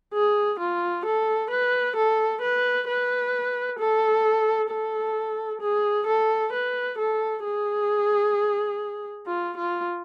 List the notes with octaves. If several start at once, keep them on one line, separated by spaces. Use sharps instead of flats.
G#4
F4
A4
B4
A4
B4
B4
A4
A4
G#4
A4
B4
A4
G#4
F4
F4